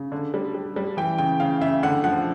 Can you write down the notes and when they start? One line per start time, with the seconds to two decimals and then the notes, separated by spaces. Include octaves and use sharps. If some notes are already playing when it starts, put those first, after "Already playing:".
Already playing: C#3
0.12 D3
0.34 G3
0.55 G3
0.76 G3
0.97 E3 G5
1.18 C#3 G5
1.40 C#3 F5
1.61 C#3 E5
1.83 D3 F#5
2.04 F3 F#5